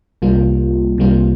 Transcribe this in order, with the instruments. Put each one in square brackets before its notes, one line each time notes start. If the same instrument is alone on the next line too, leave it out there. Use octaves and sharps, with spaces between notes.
[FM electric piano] C2 C3 G3 A#3 F4
C2 C3 G3 A#3 F4